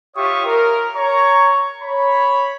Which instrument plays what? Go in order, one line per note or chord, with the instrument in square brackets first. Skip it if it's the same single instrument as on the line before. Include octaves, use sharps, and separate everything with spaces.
[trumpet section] F4 G4 C#5 E5 C#6 D#6
A#4
C#5 A#5 C#6
C#5 B5